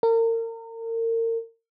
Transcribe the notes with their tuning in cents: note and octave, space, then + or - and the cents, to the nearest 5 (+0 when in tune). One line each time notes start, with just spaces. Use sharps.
A#4 -35